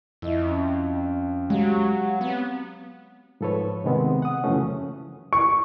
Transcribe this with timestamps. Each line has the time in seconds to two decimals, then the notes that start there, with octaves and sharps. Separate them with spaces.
0.22 F2 E4 D#5 E5
0.48 C#4
1.50 F#3 G#3 F#4 G4 F5
2.21 B3 C4
3.41 G#2 F3 A4 B4 C#5
3.84 C3 D#3 G#3 B3 C4
4.22 F#5 D#6
4.44 F#2 C#3 E3 F3 A3 C#4
5.33 C#6